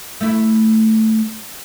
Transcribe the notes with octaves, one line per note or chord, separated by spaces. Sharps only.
A3 E4